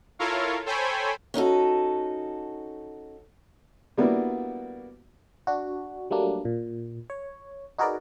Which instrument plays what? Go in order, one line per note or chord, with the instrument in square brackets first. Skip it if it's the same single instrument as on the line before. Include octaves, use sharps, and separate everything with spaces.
[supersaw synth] E4 F4 A4 A#4 C#5 F5
A4 C5 C#5 G5 G#5 B5
[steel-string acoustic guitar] C#4 D#4 F#4 A4
[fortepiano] G3 A#3 B3 D4 E4 F#4
[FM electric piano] D4 F#4
F#3 G3 A3 A#3 D4
A#2
C#5
D#4 F#4 G#4 A#4 B4 D5